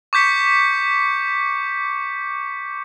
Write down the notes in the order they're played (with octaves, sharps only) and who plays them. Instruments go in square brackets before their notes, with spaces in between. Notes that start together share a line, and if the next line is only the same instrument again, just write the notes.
[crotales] C#6 D6 G6 B6 C#7